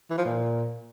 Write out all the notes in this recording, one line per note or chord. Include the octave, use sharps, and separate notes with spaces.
E3
F3
A#2